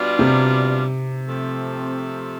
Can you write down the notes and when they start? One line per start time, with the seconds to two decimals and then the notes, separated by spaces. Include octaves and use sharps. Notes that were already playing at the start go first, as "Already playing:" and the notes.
Already playing: B2 G3 D4 F4
0.19 C3
1.26 F3 A3 C4